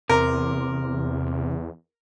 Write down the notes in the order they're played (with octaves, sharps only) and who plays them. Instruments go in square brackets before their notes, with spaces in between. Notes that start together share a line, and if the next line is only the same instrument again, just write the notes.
[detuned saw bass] E2 [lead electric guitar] C3 [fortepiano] A#4